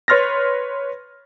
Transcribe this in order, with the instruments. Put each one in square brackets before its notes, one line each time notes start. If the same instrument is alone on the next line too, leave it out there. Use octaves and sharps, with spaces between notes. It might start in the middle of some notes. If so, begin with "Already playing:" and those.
[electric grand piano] B4 C#5 C6 F6 A6 A#6